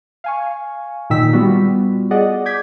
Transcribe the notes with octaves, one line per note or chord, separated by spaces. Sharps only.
F5 G#5 C#6
A#2 D#3 D#4 G5 E6 B6
G3 B3 F4 F#4
G#4 D5 D#5 F#5
D6 G6 G#6 B6